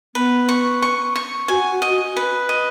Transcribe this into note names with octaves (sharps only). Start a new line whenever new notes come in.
B3 B4
C#6
C#6
C#6
F#4 G#5
D#5
B4
D#5